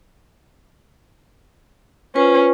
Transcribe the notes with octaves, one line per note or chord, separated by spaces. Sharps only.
C#4 F4 B4 C5